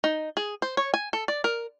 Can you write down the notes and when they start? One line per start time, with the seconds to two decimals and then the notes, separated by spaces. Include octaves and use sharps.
0.04 D#4
0.37 G#4
0.62 C5
0.77 C#5
0.94 G#5
1.13 A4
1.28 D5
1.44 A#4